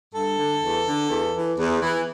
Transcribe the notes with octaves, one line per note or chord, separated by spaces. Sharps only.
G2 A4
D3
E2
D3
E2
E3
E2
E3